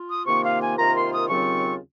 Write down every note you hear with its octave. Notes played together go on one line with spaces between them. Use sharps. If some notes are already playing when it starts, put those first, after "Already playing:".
Already playing: F4
D#6
C3 D#3 A#3 F4 C#6
F5
G#5
C3 D#3 A#3 F4 A#5
C6
D#6
D#2 C#3 F#3 C4 F4 C#6